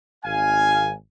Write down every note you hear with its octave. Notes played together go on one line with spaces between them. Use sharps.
G#1 F5 G#5